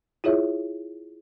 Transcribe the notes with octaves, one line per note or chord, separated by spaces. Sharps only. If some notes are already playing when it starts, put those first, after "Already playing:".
E4 F4 G#4 C#5 E5